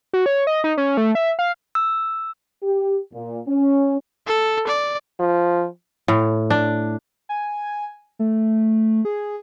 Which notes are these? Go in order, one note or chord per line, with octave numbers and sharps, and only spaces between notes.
F#4
C#5
D#5
D#4
C#4
A3
E5
F5
E6
G4
A#2
C#4
A4
D5
F3
A2
D4
G#5
A3
G#4